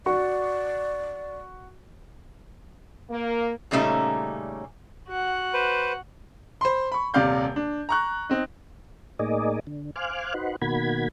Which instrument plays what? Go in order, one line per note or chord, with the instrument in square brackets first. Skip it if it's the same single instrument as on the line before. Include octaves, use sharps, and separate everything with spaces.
[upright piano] F#4 C#6 [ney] D5
[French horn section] A#3
[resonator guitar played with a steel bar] A#2 C#3 G3 A3 C#4 D#4
[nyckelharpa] F#4 F#5
[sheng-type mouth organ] B4 C5
[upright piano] C5 B5 C6
B5 C#6
D#1 C3 D5 F5 G6
D4
A#5 C#6 F#6
C4 D#4
[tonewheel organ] A2 A#3 D#4 G#4 D5 D#5
D3
C5 F5 G#5 D6 F6 F#6
D#4 F#4 B4 C5 F#5
B2 D#3 A#3 F#4 B5 G#6